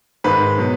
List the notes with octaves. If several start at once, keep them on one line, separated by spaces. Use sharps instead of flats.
G#2 D#3 G#3 B4
B2 F#3